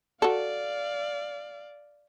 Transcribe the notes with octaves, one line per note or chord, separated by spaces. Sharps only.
F#4 A4 D5 F5